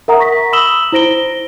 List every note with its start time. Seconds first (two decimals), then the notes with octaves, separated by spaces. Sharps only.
0.08 A#4 E5 F#5 A#5 D#6
0.20 C#6 A#6 B6
0.53 B5 D#6 E6 E7 F#7 G7
0.92 E4 C5 A#6 D7 G7